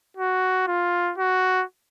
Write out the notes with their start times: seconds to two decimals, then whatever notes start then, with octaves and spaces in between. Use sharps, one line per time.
0.17 F#4
0.67 F4
1.18 F#4